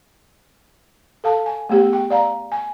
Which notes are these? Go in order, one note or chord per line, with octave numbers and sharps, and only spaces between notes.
A4 F5 A5
G#5
A3 B3 G4 G#4
G5
D5 F5 A#5
G#5